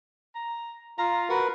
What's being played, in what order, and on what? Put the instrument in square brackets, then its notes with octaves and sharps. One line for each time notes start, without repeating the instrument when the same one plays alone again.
[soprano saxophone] A#5
[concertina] F4 F5 [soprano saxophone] A#5
[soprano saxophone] F#4 [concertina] A#4 B4